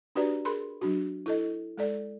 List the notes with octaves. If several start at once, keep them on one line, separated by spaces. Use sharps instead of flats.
D4 F#4 G4 B4 D5 A#5
G#4 A#4 B5 C6
F#3 D4 F#4
E4 A4 D#5
G#3 A4 D5